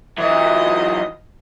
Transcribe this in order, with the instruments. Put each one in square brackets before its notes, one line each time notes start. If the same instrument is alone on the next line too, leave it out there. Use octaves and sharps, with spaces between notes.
[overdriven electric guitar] E3 F#3 [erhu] D#5